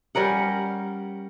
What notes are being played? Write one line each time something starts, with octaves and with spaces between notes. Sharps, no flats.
G3 C#4 A#4 F#5